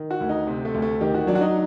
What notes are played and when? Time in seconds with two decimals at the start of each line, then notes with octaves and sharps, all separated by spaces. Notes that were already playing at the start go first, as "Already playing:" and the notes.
Already playing: D#3
0.11 F#4
0.21 D2
0.29 D#4
0.47 C3 C4
0.65 A3
0.74 D2
0.82 A3
1.01 D#3 G4
1.14 F#4
1.27 F#3 D4
1.35 F#4
1.41 D#4